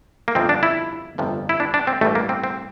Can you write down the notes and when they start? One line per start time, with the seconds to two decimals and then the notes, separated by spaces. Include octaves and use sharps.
0.28 A#3
0.35 G1 F2 C3 F3 C4
0.49 D4
0.63 E4
1.18 G1 F2 C3 F3
1.49 E4
1.60 D4
1.74 D4
1.87 C4
2.01 A1 G2 E3 G3 A3
2.15 A#3
2.29 C4
2.44 C4